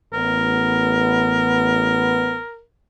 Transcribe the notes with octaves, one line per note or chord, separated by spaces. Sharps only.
A1 B3 A#4